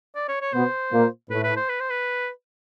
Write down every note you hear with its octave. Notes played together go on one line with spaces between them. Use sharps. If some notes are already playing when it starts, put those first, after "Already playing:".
D5
C#5
C#5
B2 B3 C5
A#2 A#3
A2 A3 B4
B4
C5
B4
C5
B4